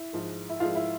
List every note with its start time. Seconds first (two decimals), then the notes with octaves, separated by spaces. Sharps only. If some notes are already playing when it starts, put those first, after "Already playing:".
Already playing: E4
0.13 G#2 F3 G#3
0.49 E4
0.60 G#2 F3 G#3 F4
0.75 E4